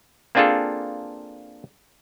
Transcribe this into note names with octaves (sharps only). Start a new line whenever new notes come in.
A#3 C4 D4 F4 G#4 A4